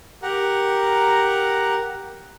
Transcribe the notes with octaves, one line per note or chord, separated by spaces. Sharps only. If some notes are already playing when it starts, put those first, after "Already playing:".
G4 A#4 F#5 A#5